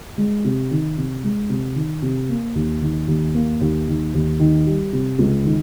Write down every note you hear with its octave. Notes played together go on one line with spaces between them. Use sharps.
G#3
C3
D#3
C3
G#3
C3
D#3
C3
A#3
D#2
D#3
D#2
A#3
D#2
D#3
D#2
D#3
G3
C3
C#2
D#3